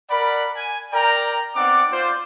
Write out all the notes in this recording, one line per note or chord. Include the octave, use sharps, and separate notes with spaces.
A#4 D5 F#5 B5
G#5
A#4 D5 G5 A#5
B3 C4 D#4 D5 F#5 D6
F4 C5 D5